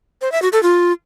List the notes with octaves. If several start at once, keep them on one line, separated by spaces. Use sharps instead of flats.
C5
E5
F#4
A4
F4